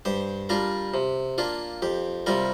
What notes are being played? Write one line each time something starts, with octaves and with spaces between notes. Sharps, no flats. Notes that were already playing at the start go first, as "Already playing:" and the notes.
G2 G4 C5
G3 D4 F4 A#4
C3
A#3 D4 F4
F2 G4
C3 G3 F4 A#4